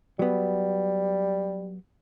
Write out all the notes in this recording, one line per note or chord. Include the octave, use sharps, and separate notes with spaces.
F#3 G3 B3